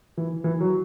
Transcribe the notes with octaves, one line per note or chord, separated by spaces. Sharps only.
E3
E3
F#3